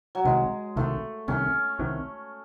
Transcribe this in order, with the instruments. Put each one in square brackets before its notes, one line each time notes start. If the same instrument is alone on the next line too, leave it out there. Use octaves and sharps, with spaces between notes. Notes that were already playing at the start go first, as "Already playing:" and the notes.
[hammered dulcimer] F#3
[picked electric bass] C2 C3 D#3 [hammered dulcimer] G#3
[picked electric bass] C2 C3 D#3 [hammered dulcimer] A3
[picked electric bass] C2 C3 D#3 [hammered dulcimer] C#4
[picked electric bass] C2 C3 D#3